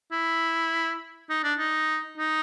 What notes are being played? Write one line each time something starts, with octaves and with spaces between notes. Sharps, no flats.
E4
D#4
D4
D#4
D#4